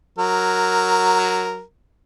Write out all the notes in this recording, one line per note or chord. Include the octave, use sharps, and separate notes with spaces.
F#3 A#4